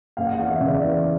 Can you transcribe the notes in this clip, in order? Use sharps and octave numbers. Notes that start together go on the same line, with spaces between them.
F#1 F5
F#5
F5
E2
E5
C#3
D5
E3